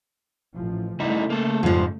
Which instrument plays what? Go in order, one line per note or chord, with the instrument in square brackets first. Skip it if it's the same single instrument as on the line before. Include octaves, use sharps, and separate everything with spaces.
[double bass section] A1 F3
[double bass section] C#3 A3 [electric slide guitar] G3 D#4 E4
[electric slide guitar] A#3 A4
[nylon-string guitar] F2 F3 [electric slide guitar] G#2 G3